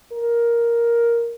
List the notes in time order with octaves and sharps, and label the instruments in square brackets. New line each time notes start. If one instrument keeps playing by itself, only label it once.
[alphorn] A#4